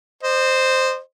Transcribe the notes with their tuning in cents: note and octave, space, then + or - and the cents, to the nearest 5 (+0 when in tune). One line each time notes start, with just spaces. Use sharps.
C5 +0 D#5 -35